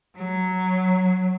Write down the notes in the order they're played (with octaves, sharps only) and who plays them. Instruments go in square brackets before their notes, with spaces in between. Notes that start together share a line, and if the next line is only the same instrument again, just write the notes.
[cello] F#3